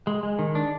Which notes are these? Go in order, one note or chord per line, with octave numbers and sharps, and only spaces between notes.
G#3
G#3
D#3
D4